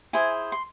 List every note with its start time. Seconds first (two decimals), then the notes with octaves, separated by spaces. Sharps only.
0.13 E4 G#4 C5 G#5
0.52 C6